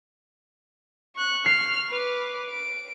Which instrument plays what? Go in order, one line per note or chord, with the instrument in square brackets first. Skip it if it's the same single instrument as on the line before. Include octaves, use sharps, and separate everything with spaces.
[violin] C#6 F#6
[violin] F6 [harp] C7
[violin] B4 D6
D7